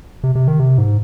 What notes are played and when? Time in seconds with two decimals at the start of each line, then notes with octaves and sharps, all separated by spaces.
0.24 C3
0.35 C3
0.48 D#3
0.60 C3
0.78 G#2